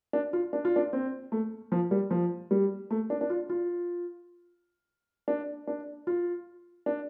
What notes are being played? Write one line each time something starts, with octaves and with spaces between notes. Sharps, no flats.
D4
F4
D4
F4
D4
C4
A3
F3
G3
F3
G3
A3
D4
D4
F4
F4
D4
D4
F4
D4